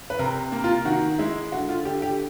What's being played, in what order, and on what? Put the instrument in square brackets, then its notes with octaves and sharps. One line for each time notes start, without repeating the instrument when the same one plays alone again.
[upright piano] B4
C3 A#4
A#3
F4
D#3 F#4
G#3 E4
D3 F#4
F4
D3 G4
G4